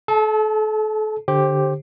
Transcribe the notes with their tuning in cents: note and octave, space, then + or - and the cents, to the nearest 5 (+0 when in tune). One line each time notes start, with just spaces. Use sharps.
A4 -35 A5 +0
D3 +0 G4 +0 C5 +30